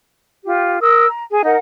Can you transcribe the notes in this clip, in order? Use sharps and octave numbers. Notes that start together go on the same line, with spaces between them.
F4 G4
A#4 D#6 E6
A#5
G#4
D#4 A#4 F#5